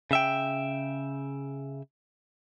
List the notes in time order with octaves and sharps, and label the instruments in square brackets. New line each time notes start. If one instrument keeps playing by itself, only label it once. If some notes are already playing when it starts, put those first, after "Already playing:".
[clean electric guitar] C#3 E5 G5